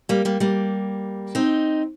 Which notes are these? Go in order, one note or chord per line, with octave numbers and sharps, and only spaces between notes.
G3 A#3
G3 A#3
G3 A#3
C4 D#4